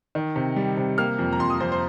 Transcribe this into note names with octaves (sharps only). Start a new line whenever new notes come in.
D#3
C3
G3
C3
A#3 F6
F2
A#5
F2 C6
D#6
F2 C5
C5